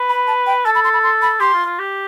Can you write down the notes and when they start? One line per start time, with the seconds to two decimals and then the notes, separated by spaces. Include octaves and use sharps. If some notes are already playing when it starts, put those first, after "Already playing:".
Already playing: B4
0.09 B5
0.27 A5
0.47 G5
0.65 A4 A5
0.75 B5
0.84 C6
0.94 B5
1.03 C6
1.22 B5
1.40 G4 C6
1.54 F4
1.65 F4
1.79 G4